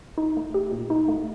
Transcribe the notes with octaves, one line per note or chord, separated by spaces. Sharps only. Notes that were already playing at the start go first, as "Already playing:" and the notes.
D#4
A3
G4
A#2
D#4
A3